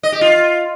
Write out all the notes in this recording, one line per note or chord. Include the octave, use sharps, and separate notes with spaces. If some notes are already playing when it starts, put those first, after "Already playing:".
D#5
G4
F4